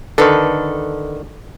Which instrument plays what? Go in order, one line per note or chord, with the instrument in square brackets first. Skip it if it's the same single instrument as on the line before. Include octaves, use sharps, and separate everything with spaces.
[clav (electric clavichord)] D3 D#3 [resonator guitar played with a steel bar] A4 B4